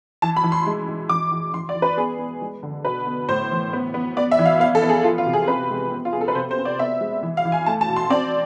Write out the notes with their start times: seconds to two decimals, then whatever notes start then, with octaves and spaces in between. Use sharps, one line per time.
0.22 E3 A5
0.36 B5
0.44 E3
0.52 C6
0.66 G#3
0.88 G#3
1.09 E3 D6
1.31 E3
1.54 E3 C6
1.69 D5
1.75 E3
1.82 B4
1.97 B3 G#4
2.19 B3
2.42 G#3
2.63 D3
2.85 B2 B4
3.07 B3
3.29 A2 C5
3.51 E3
3.73 B3
3.94 B3
4.17 B3 D5
4.31 E5
4.39 E3
4.45 F5
4.60 B3 F5
4.75 A4
4.83 B3
4.89 G#4
5.04 F3 F4
5.18 F4
5.26 C3
5.33 G#4
5.48 C4 B4
5.70 G#3
5.92 B3
6.05 F4
6.13 B3 G#4
6.21 A4
6.28 B4
6.35 C3 C5
6.51 C5
6.58 C4
6.65 D5
6.79 B3 E5
7.01 G#3
7.23 E3
7.37 F5
7.45 E3
7.52 G#5
7.66 A3 A5
7.81 A5
7.89 B2
7.96 C6
8.10 C4 D5